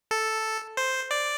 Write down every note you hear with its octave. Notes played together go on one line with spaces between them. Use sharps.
A4
C5
D5